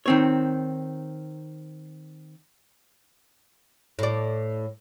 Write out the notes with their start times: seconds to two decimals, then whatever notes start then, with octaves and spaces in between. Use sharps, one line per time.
0.06 D#3 C4 C#5
3.99 A2 D5